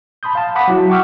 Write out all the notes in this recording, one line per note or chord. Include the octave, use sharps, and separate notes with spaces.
A5 B5 C6 D#6 G6
F5 A5
F#5 B5 D6 D#6 B6
F#3 E4 F#4
F#5 G5 C#6 D6 E6 F6